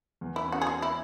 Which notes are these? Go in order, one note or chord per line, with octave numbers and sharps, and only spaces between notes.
E2
E4
C#4
F#4
G#4
C#4 F#4
E4